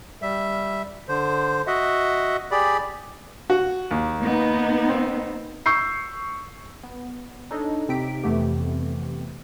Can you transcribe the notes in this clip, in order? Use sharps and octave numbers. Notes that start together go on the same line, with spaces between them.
G3 E5
D3 C5
F#4 D#5 E5 F#5
G4 G#4 D5 B5
F#4
D#2
A#3 B3 D#4
C4
C#6 E6 G6 C7
B3
D4 D#4 A4 C#5 D#5
C3 C4 D#4 G4 B6 D7
F2 C3 E3 A3 B3 G4